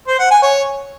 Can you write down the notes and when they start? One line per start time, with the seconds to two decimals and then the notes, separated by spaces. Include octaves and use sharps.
0.08 C5
0.19 F#5
0.31 G#5
0.42 C#5